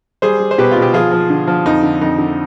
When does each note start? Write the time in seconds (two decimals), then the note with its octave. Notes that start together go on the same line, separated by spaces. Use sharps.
0.22 G3 G#4 C5
0.40 G3
0.51 C5
0.58 B2 G4 B4
0.71 F4
0.77 B2
0.82 G4
0.93 F3 F4 G#4
1.12 F3
1.30 D3
1.47 F3
1.66 F2 D#4
1.83 D3
2.01 F2 D#4
2.18 D3